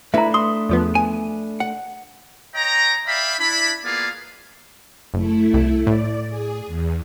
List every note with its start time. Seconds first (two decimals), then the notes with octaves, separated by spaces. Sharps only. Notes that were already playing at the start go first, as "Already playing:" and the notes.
0.14 A3 D4 E4 B4 E5 A#5 B5
0.34 C6 D#6
0.69 E2 F3 B3
0.95 G#5
1.60 F#5
2.55 C#5 D#5 G5 A#5
3.08 D5 E5 F5 G5 B5
3.40 D4 E4 B5
3.84 A#3 B3 F4 G#4 D5 F5
5.14 F#1 A3 E4
5.54 C2
5.87 A2 D5
6.29 G#4
6.67 E2